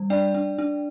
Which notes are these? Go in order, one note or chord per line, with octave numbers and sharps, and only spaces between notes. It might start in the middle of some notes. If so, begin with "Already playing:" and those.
Already playing: G3
D4 D5 G5
D4
D4